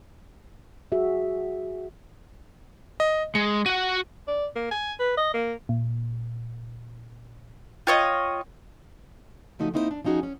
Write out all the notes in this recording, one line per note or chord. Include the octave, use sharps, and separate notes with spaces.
F#4 G#4 E5
D#5
G#3 C#7
F#4 F#5 D#7
D5
A#3
G#5
B4
D#5
A#3
A#2
F4 C#5 D#5 G5
C#3 F3 A3 D#4 F#4
A#3 C4 D#4 E4 A4 C5
D4
F3 C#4 D#4 F#4 G#4
C#4